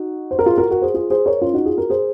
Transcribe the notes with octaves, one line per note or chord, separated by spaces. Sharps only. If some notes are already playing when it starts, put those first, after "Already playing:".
Already playing: D#4 F#4
C5
A#4
F4 G#4
F#4 A#4
F#4 A#4
G#4 C5
F4 G#4
G#4 C5
A#4 C#5
C#4 F4
D#4 F#4
F4 G#4
F#4 A#4
G#4 C5